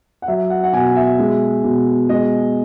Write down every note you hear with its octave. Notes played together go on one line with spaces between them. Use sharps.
F#5
F#3 E5
F#5
F#5
B2 G#5
E5
G#3
B2
G#3 D#5